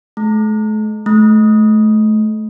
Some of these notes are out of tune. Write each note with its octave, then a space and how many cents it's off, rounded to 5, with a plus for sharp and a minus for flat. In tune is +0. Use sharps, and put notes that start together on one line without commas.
A3 -40
A3 -30